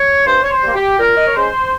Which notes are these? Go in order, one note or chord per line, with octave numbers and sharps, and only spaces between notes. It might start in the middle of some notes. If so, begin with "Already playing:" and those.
Already playing: C#5
G2 C5
C#5
C5
G3 A#3
G4
A#2 A#4
D#5
C#5
G#3 C#4 C5